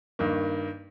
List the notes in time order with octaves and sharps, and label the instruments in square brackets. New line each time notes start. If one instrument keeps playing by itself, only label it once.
[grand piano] G2 D#3 A#3